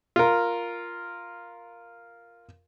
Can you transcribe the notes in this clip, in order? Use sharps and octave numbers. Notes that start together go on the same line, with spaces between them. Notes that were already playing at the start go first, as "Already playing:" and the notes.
F4 A#4